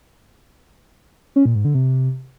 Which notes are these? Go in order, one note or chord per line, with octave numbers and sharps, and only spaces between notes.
C#4
A#2
G#2
D3
C3